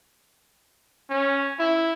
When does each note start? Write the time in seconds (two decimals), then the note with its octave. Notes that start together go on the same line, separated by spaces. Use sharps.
1.10 C#4
1.59 E4